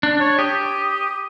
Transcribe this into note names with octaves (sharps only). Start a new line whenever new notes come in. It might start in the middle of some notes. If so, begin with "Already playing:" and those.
D4
C#5
G4 D#6